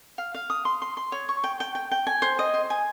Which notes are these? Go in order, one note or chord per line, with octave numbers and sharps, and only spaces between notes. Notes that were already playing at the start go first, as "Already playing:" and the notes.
F5
F5
D#6
C6
C6
C6
C#5
C#6
G5
G5
G5
G5
G#5
C5
D#5
C5
G#5